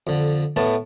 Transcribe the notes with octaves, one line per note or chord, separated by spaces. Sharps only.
F2 D3
A2 A3 B3 A5